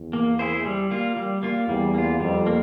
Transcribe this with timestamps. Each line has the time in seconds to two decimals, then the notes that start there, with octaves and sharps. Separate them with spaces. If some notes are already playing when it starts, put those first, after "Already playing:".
Already playing: E2
0.13 A#3
0.39 E4 G#4 C5
0.65 G3
0.91 A#3 F4
1.17 G3
1.43 A#3 F4
1.68 E2 G3
1.94 A#3 F4
2.20 F2 G3
2.47 A#3